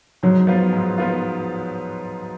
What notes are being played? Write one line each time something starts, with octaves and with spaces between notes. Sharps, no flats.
G#2 F#3
F3 B3 F4
G#2
F3 B3 F4